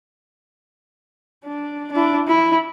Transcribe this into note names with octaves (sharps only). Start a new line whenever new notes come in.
D4
D4 E4
E4